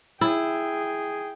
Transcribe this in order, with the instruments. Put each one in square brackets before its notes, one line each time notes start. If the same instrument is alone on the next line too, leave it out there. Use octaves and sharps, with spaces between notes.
[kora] E4 [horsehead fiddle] G#4 G5